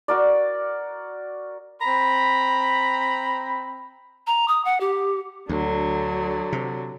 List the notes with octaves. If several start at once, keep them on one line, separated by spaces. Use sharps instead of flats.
F#4 A#4 D5
C4 A#5 B5
A#5
D#6
F#5
G4
D2 D3 F#3
C3